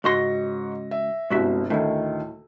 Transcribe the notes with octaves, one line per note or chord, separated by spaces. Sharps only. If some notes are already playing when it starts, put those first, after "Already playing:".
C#2 G#2 F#4 C6 C#6 A#6
E5
G1 C2 G#3 F#4 E5
D2 A2 D#3 A3